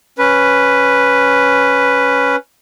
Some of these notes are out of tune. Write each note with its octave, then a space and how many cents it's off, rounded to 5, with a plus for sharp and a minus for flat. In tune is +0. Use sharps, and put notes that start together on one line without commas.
C#4 +0 B4 +0